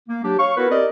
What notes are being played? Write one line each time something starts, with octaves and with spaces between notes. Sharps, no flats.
A#3
F#3 D4 G4
C#5 F5 C#6
B3 E4 F#4 A#4 B4
C4 G4 A#4 D5 D#5